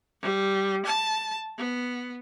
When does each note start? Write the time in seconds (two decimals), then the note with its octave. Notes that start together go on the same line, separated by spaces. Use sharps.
0.21 G3
0.86 A5
1.58 B3